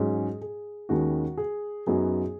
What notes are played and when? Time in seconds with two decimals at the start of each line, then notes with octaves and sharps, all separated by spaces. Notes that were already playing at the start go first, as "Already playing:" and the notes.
Already playing: G#2 F#3 C#4 G#4
0.41 G#4
0.89 D#2 D#3 G#3 C#4 F#4
1.38 G#4
1.87 F#2 F#3 B3 D#4 G#4